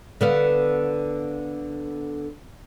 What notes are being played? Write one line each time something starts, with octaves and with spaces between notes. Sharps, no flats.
D3 B3 F5